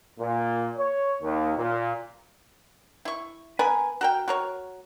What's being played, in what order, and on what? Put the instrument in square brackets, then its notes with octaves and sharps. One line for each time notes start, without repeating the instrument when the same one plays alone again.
[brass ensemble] A#2
C#5
D#2
A#2
[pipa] E4 C#6
B3 A#4 B4 G#5
F#4 A#4 G5
F#4 A#4 C#5